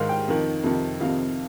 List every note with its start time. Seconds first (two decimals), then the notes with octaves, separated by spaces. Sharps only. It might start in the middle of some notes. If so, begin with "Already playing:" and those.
Already playing: G#2 D#3 F5
0.09 G5
0.28 F2 D#3
0.63 F2 C3 D#3
1.00 F2 C3 D#3 F5